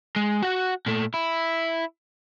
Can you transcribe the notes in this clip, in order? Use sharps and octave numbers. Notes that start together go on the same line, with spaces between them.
G#3
F#4 F#5
A#2 A3
E4